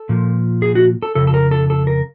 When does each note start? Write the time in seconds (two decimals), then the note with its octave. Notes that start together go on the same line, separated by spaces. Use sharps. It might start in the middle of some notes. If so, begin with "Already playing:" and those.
Already playing: A4
0.09 A#2 F3
0.62 G#4
0.75 F#4
1.03 A4
1.15 F2 C#3 A4
1.27 A4
1.34 A#4
1.51 A4
1.70 A4
1.87 A#4